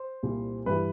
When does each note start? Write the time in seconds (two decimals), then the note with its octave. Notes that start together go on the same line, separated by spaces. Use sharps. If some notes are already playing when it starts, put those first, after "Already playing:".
Already playing: C5
0.23 C2 A#2 G3
0.66 G2 E3 G3 B4